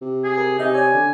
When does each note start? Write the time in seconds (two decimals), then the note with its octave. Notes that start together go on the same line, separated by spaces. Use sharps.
0.02 C3
0.24 G#4
0.38 A#4
0.59 C3 D#4 D#5 E5 G#5
0.74 C#5 D5 G#5
0.94 D3